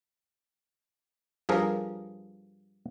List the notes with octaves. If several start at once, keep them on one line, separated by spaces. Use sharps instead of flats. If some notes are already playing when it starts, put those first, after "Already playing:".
G2 F3 G#4 A#4